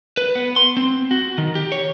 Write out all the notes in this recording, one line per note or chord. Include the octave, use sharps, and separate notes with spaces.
B4
B3
C6
C4
F#4
D#3
G4
C#5